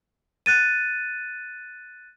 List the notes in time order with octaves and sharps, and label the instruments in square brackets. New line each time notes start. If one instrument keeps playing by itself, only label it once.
[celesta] F#6 A6 D#7